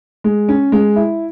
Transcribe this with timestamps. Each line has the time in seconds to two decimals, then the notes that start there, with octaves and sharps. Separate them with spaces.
0.24 G#3
0.49 C#4
0.72 G#3
0.96 E4